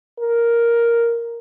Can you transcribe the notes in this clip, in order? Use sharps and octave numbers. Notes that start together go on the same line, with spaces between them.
A#4